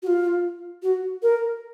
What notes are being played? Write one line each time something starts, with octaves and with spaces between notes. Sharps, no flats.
F#4
F4
F#4
A#4